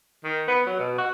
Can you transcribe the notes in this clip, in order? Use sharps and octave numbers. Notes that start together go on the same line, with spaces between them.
D#3
B3
F#3
B2
F#4